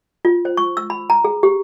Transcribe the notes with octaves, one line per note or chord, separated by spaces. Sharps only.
F4
C5
C#6
E6
B5
A#5
G#4
G4